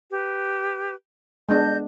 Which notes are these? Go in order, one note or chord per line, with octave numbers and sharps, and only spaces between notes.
G4 B4
G#3 B3 D4 D#5 G6